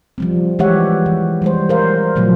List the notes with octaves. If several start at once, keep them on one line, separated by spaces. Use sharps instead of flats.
F3 G3 C4
E3 G#3 G4 C#5 E5 F#5
E3
G3 G#3 C5
A#4 C5 F5
A#2 C#3 F3 F#3 A3